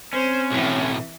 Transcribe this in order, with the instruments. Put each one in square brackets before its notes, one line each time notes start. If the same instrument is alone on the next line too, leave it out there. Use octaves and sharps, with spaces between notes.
[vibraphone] C4 [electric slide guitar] C#4 [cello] C5
[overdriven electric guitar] B1 A2 [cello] E3